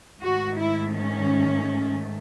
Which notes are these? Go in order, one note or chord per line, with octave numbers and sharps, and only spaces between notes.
G#2 D#3 A3 F#4
E4
C#4